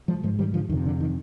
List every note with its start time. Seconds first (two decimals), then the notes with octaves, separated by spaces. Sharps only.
0.08 F3 G#3
0.23 G#2 F3 G#3
0.39 D#3 G3
0.54 D3 F3
0.69 F2 D#3
0.72 C3
0.85 D3
1.00 D#3